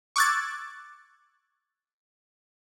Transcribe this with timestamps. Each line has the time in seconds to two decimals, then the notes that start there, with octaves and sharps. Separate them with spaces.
0.16 C#6 D6 E6 F#6 G#6 A6